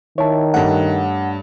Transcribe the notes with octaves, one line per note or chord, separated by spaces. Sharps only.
D#3 E4 C#5 A5
G2 A3 F#5